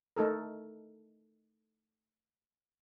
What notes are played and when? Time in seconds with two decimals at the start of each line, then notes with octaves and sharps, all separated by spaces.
0.16 A3 D#4 A4 A#4